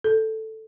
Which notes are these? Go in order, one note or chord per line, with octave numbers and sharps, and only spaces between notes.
A4